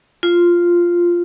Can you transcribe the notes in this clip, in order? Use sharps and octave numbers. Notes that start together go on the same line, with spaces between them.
F4